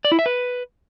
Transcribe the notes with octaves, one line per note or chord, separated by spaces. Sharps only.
D5
E4
E5
B4